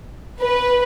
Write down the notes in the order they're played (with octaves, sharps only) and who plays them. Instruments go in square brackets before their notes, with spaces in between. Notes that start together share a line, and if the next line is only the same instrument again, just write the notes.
[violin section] B4